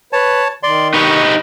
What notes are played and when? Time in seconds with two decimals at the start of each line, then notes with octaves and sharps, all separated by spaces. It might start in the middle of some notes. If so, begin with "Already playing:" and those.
0.13 B4 C#5 A5
0.63 D#3 D5 C6
0.94 D#4 G4 B4 C#6